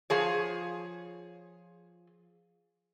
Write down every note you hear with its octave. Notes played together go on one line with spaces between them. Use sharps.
F3 G#4 C#5